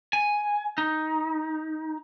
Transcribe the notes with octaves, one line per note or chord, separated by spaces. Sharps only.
G#5
D#4